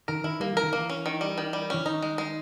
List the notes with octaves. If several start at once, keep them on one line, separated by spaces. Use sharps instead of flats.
D#3 A#4
D#3 E4
G3 A#3
E3 A#4
D#3
E3 A#3
C#4
D#3
G3
D#3
G3
E3 C#4
D#3 D#4
G#3
G#3